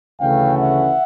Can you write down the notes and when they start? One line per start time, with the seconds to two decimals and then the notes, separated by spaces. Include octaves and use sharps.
0.21 D2 C#3 E3 A3 C#4 F5 G5
0.58 E5 F#5